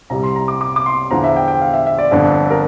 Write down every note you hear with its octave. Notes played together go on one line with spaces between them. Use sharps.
C2 C3 G3 A#5
C6
A#5
D6
D6
D6
C6
E2 D3 F3 A#5
E5
G5
G5
F5
E5
E5
D5
G1 F2 D3
A#4